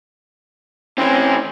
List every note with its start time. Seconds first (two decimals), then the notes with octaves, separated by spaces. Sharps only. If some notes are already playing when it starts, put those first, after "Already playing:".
0.98 E3 C4 C#4